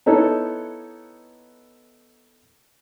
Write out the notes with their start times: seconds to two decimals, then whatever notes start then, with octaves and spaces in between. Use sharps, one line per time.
0.06 B3 D#4 E4 A4 C#5